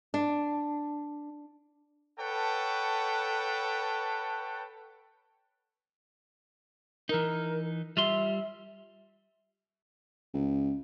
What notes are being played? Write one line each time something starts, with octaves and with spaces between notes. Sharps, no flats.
D4
A4 B4 C#5 F#5 G5 A5
E3 D#4 A#4
G3 F4 E5 C6
C#2